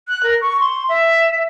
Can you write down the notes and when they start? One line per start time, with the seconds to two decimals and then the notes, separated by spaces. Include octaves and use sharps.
0.09 F#6
0.23 A#4
0.41 C#6
0.60 C6
0.89 E5